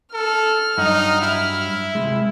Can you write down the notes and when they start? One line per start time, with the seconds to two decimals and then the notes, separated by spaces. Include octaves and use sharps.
0.13 A4 F6
0.78 G2 F#3 D#4 F#4
1.21 E4
1.95 C3 G#3